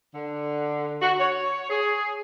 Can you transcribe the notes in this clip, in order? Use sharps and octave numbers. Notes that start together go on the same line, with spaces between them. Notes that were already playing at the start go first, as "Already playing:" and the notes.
D3
F#4
C#5
G#4